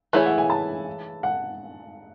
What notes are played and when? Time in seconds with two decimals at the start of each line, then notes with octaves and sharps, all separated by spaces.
0.13 E3 A3 E4 G#4 C#5 E5
0.26 F#5
0.38 G#5
0.50 A5
1.23 F#5